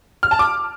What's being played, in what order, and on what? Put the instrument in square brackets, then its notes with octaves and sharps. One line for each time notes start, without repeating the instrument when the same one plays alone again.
[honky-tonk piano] F6
A5
D6